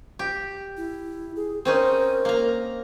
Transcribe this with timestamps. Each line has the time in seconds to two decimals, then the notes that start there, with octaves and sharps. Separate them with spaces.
0.19 G4
0.77 E4
1.36 G#4
1.65 C4 C#4 D#4 A#4
2.25 A#3 A#5